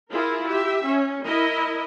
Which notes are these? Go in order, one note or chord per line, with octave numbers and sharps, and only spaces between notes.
E4 F4 G#4 A#4
G4 E5
C#4
E4 A#4 D#5